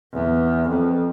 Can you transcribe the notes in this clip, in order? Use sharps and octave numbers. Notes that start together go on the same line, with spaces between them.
E2
F2